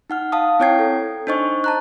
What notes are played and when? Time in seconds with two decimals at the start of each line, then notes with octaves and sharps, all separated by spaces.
0.10 D#4 F#5 F6
0.32 F5 A5 D#6
0.60 C4 E4 C#5 G5 G#6 C7
0.79 A4
1.27 D4 D#4 C5 D#5 C#6
1.64 A5 A#5 F#6